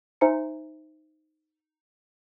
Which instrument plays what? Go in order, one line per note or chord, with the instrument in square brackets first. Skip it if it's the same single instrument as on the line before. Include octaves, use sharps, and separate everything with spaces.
[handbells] D#4 C5 E5 G#5 A#5 C#7